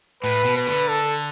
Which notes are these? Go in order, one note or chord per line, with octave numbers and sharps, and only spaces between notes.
A2 B4
B2
B4
D3
A4